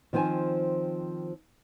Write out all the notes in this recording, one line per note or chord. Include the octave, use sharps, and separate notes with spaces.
D#3 F3 C4 C5 G#5